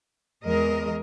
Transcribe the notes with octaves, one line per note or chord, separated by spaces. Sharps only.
E2 G#3 A#4 D#5